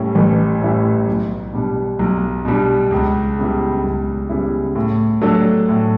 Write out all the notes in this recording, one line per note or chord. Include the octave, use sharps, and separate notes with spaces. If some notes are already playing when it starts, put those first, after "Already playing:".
Already playing: A2 G3 C#4 E4
A1
A2 G3 C#4 E4
B1
B2 G3 D4
B1
B2 G3 D4
C#2
C#3 G3 B3 E4
C#2
C#3 G3 B3 E4
A2
F#3 A3 D4 A4
A2